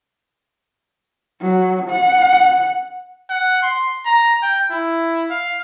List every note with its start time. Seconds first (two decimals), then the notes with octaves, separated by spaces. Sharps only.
1.42 F#3
1.91 F#5
3.30 F#5
3.63 C6
4.06 A#5
4.42 G5
4.71 E4
5.30 F5